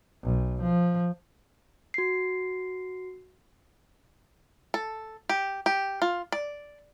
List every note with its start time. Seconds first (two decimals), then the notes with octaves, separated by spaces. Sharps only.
0.23 B1
0.62 F3
1.94 F#4 C7
4.74 A4
5.29 G4
5.66 G4
6.02 F4
6.32 D5